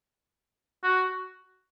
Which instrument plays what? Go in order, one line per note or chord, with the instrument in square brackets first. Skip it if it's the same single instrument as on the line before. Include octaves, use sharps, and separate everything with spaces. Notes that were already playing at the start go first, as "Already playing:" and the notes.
[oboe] F#4